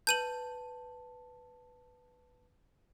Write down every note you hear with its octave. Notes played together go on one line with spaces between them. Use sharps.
B4 A5 G6 D#7 F#7